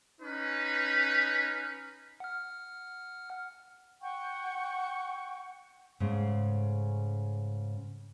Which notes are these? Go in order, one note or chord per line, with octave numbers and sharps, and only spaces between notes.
C#4 D#4 B4
F#5 F6
F#5 G5 C#6
G#2 C#3 A3